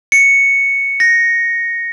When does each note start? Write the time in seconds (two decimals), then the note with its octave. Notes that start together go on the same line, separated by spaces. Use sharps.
0.12 C#7
1.00 A#6